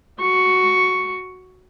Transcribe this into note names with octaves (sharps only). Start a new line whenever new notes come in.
F#4 C#6